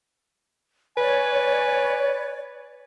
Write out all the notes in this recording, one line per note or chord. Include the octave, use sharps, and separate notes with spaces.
B4 C#5 D5 G#5